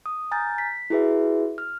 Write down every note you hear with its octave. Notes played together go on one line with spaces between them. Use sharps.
D#6
G#5 A#5 F6 G6 A6
B6
E4 F#4 G#4 B4 E5
F6